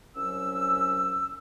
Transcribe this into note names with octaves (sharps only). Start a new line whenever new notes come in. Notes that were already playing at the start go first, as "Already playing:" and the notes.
C2 F#3 C#4 E6